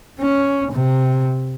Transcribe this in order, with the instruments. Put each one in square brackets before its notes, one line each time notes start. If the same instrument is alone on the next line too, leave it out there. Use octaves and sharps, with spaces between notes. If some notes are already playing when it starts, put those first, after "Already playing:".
[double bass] C#4
C3